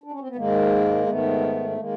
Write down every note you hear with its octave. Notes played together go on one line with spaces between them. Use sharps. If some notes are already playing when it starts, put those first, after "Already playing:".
D4
C#4
C4
B3
G#2 D#3 G#3 A#3
G#2 D#3 A3 B3
B3
D#3 G#3 A#3